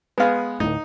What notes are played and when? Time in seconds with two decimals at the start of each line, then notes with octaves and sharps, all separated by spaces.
0.18 G#3 B3 G#4 B4 F5
0.60 D1 A2 D#4